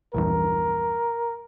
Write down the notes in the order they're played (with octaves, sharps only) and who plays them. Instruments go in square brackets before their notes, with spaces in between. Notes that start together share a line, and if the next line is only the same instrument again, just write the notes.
[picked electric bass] A#1 E2 G2 [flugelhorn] A#4